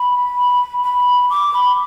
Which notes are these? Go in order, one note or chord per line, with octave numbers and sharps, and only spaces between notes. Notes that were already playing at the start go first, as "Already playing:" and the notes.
Already playing: B5
B5
D6
B5